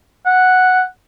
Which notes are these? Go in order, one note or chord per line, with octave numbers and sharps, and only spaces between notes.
F#5